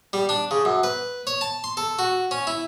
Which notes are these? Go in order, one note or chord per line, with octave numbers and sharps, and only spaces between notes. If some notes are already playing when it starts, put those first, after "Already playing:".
G3
D4
C#3
F#2
B4
C#5
A5
C6
A4
F#4
C#4
E4